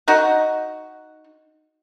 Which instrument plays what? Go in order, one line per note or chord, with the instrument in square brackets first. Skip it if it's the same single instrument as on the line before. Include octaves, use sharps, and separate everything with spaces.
[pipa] D#4 F#4 F#5